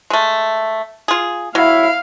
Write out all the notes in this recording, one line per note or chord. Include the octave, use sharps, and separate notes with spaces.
G#3 A3
F4 G#4
F#3 E4 F5